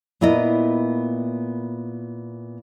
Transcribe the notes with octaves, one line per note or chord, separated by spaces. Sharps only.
A#2 B3 E4 A#4 D#5